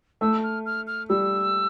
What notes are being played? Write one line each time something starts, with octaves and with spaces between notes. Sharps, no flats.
A3 E6
F6
F6
F6
G3 E6